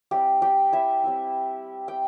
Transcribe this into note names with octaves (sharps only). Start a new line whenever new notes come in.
G3 C4 E4 G4 G5
G4 G5
E4 E5
G3 C4 E4
G5